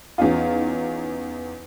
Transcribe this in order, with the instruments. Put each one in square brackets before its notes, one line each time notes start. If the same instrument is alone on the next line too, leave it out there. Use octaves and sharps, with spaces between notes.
[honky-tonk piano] E2 C#4 D#4 F4